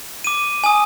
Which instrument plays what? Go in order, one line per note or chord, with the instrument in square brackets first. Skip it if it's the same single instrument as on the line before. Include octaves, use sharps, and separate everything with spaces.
[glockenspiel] D6 D#7
G#5 D#6